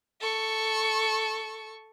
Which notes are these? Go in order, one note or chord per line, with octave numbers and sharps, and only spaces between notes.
A4 C#6